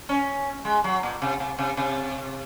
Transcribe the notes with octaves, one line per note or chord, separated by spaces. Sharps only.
C#4
G#3
F#3
A#2
C3
C3
C3
C3